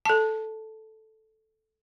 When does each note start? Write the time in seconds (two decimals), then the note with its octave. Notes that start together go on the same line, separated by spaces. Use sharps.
0.05 A4 A5